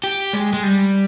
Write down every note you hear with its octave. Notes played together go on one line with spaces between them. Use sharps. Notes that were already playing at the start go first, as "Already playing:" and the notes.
G4
G#3
G#3
G3